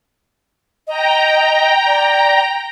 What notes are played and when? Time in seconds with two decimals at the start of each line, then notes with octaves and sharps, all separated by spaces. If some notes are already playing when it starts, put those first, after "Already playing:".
0.87 D#5 G5 A#5
1.86 D5